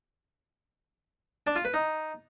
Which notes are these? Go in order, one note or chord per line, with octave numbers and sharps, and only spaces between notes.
D4
F4
B4
D#4